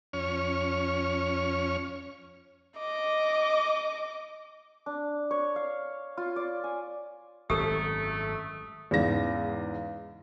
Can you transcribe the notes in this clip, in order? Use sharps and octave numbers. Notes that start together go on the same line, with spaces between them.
F2 C#4 C#5 F6
D#5 D6
D4
C#5
F5
F4
D5
G#5
G#1 F#2 A3 G4 A4 D#6 E6
E2 G#2 C#3 A#6